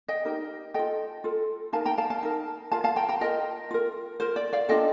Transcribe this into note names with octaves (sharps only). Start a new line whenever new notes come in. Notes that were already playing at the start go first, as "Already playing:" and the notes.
D#5 G5
D#4 G4 A#4
F4 A4 D#5 G5
F4 A4
D#4 A#4 F5 A5
G5 A#5
F5 A5
F5 A5
D#4 A#4
F4 A#4 F5 A5
F5 A5
G5 A#5
G5 A#5
F4 A#4 D#5 G5
F4 A#4
F4 A#4 C5
D5
D5 F5
D4 F4 A4 D#5 G5